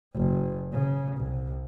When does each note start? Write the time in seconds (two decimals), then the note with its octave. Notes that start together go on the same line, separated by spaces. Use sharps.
0.15 F#1
0.73 C#3
1.17 C2